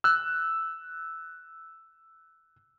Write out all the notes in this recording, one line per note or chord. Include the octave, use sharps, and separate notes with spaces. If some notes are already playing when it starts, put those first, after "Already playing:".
E6 F#6